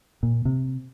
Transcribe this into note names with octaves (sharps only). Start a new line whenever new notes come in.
A#2
C3